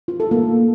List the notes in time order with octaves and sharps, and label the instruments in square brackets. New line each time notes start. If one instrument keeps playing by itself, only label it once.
[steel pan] F4
A4
A#3